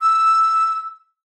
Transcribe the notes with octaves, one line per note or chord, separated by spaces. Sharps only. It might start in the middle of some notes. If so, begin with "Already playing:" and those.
E6